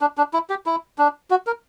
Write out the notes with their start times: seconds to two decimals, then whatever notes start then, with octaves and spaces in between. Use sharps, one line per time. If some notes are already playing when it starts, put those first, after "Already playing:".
0.01 D4
0.18 D4
0.33 E4
0.50 G4
0.66 E4
0.98 D4
1.30 F#4
1.47 A#4